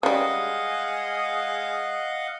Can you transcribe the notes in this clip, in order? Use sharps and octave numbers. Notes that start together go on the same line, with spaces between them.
C#3 G3 G#3 G#4 D#5 F5 F#5 D#6